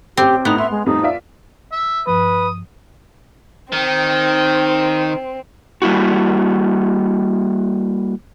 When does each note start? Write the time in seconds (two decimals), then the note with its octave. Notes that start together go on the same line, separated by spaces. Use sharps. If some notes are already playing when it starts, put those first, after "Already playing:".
0.17 A1 C4 G4 D6
0.45 A2 B3 D#4 F7
0.58 E5 C6
0.71 G#3
0.86 F2 A2 G3 D#4
1.03 F4 D5 E5
1.72 E5
2.07 G2 F3 B4 D#6
3.73 D#3 C4
5.82 G3 A#3 E4 F#4